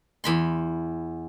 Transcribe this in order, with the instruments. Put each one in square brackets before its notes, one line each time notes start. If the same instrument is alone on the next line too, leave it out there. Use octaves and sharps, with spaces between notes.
[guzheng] E2 B5 C6